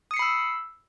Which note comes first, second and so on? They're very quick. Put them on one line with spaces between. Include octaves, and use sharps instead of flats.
D#6 C#7 C7 B5 E6